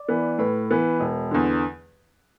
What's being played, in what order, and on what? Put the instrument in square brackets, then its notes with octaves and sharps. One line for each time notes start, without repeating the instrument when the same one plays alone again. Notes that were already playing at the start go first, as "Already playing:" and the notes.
Already playing: [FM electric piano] D5
[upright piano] E3 B3
[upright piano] A2 [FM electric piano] B4
[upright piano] E3 B3
E1
E2 D3